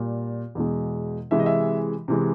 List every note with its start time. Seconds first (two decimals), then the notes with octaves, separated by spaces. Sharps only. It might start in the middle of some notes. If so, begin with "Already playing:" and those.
Already playing: A#2 G3
0.55 E2 B2 G#3
1.31 C3 E3 G#3 E5
1.39 D#5
1.46 E5
2.08 C3 E3 G#3